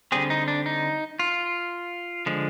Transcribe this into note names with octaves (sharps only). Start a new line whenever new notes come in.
D3 G3 C4 G#4
D#4
D4
D#4
F4
D3 F3 G#3